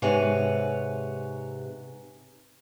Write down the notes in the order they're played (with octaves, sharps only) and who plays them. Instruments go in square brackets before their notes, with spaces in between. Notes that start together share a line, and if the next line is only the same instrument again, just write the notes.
[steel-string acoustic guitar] G#2 C3 G#3 B4 C#5 G#5